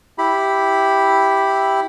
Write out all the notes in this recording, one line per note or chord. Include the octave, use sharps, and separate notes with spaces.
E4 G4 B5